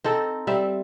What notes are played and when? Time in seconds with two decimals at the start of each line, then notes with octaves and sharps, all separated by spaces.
0.04 C4 D#4 A4
0.47 G3 C4 E5